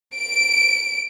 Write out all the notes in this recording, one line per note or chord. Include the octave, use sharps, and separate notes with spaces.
D7